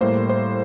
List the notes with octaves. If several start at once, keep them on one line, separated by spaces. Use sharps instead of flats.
A2 G3 A#3 C5
C5